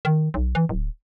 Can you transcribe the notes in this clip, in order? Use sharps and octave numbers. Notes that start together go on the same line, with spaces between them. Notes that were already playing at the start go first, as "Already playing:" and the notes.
D#3
B1
E3
D1